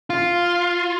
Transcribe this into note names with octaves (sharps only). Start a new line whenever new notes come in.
F4